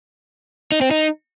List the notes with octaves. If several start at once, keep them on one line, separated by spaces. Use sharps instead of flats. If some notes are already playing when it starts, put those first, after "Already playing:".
D#4
C4
D#4